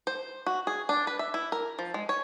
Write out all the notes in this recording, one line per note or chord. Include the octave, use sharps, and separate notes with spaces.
C5
F#4
G#4
D4
B4
E5
E4
A#4
F3
G#3
C#5